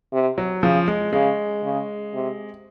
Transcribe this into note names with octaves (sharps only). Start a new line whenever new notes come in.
C3
F#3
C#3 F3
G#3
C#3 G#3
C#3
C3